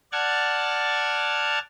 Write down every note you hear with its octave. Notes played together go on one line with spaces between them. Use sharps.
D5 F#5 A5 F6 G#6